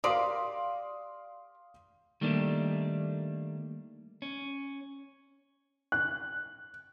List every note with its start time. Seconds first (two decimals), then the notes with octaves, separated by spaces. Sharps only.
0.04 G4 A#4 D5 F5 C6 D#6
2.21 D#3 G3 A3 A#3 D4
4.22 C#4
5.92 F#6